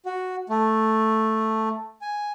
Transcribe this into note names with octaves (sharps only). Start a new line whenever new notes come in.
F#4
A3
G#5